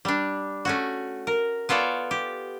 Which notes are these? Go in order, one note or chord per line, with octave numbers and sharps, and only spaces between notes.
G3 D4
A3 C#4 F#4
A#4
B3 F4 A4 C#5 D5
G4